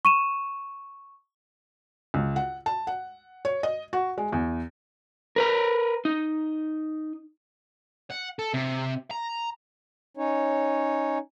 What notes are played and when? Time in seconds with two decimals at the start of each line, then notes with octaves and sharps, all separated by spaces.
0.05 C#6 D#7 E7
2.14 C#2
2.36 F#5
2.66 A5
2.87 F#5
3.45 C#5
3.63 D#5
3.93 F#4
4.18 G#3
4.33 E2
5.36 A#4 B4 A#5
6.05 D#4
8.10 F#5
8.39 A4
8.54 C3
9.11 A#5
10.17 C#4 D#4 C#5